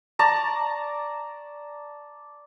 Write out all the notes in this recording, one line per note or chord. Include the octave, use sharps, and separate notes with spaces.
D5 A5 A#5 C#6